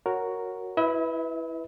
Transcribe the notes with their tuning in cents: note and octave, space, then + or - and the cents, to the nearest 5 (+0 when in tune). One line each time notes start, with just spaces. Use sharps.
F#4 +0 A#4 +0 C#5 +0
E4 +0 B4 +0 E5 -45